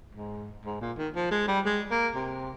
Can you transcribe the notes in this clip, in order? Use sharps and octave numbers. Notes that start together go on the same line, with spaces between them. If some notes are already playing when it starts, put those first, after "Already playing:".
G#2
G#2
A#2
D#3
F3
G#3
G3
G#3
A#3
C3